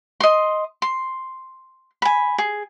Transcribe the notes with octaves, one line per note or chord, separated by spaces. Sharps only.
D#5 C6
C6
G#5 B5
G#4